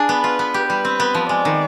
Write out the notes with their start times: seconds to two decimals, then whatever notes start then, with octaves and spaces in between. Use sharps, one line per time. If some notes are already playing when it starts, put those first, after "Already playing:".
Already playing: D4 G#4
0.09 B3 B4
0.24 F4
0.39 B3
0.54 G4
0.70 G3 B4
0.85 C4
1.00 B3
1.15 F3
1.29 G#3 D5
1.45 D#3